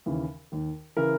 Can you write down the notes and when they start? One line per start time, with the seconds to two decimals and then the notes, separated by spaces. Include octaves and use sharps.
0.06 D#2 C#3 E3
0.52 D#2 D#3
0.97 C#3 E3 A#4